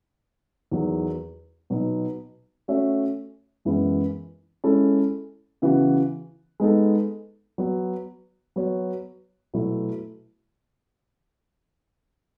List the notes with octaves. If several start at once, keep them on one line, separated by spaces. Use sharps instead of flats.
E2 D#3 F#3
B2 F#3 B3 D#4
A3 C#4 F#4 C#5 E5
F#2 E3 G#3 B3 E4
G#3 C#4 E4 A4
C#3 E3 B3 F#4
G#3 B3 D#4 A4
F#3 B3 F#4
F#3 B3 F#4 C#5
B2 F#3 A3 E4